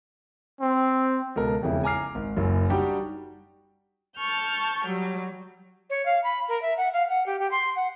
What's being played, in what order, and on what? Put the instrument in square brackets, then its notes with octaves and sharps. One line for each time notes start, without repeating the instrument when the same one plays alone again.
[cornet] C4
[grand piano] C#2 B2 A4 A#4
E1 F2 C#3 E4
G#5 A#5 D6 F6 C7
G#1
F#1 F#2
G3 D4 D#4 F#4 G4 G5
[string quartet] A5 C#6 F6 G6
F#3 G3
[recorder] C#5
F5
B5
A#4
E5
F#5
F5
F#5
G4
G4
C6
F#5